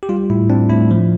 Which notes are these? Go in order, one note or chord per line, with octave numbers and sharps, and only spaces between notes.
G4
G3 F4
A2 E4
C4 D4
A2 E4
F3